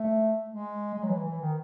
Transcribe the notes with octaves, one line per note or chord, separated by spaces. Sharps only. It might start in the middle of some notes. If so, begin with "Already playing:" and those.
Already playing: A3
G#3
G#3
F#3
E3
E3
D#3